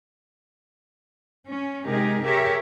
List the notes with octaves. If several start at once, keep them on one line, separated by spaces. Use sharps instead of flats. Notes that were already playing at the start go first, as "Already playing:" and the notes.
C#4
C3 G#3 D#4 G4 G#4 A#4
G4 G#4 A#4 C#5 E5